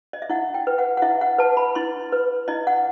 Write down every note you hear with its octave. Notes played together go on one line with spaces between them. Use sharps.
D#5
E5
E4 F#5
G5
B4
F#5
F#5
E4 E5
F#5
B4 A5
B5
E4 C6
B4
E4 D#5
F#5